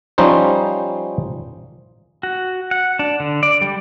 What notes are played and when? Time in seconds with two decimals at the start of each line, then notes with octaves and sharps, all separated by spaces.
0.18 F3 G3 C#4 D#4 C5
2.23 F#4
2.71 F#5
2.99 D4
3.20 D3
3.43 D5
3.61 G3